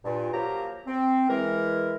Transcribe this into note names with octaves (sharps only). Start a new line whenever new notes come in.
G2 A#2
F3 F#3 A#3 G4 A#4 A#5
C4
E3 G#3 A#4